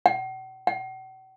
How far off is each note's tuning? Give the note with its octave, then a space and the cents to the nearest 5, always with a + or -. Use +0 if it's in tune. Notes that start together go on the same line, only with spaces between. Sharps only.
F#5 +45
F#5 +45